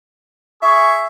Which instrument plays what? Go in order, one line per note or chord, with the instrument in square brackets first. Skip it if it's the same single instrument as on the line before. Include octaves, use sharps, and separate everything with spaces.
[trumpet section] G#4 C#6 [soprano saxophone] E5